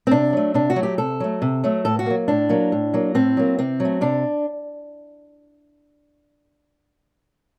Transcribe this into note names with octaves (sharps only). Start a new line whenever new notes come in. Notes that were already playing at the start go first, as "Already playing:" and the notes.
C4
C3 D4
F#3 A3
C3 D4
F#4
F#3 A3
G4
C3 A4
F#3 A3
C3
F#3 A3
A2 A4
F#4
F#3 A#3
A2 D4
F#3 A#3
A2
F#3 A#3
A2 C4
F#3 A#3
C3 C4
F#3
A3
C3 D4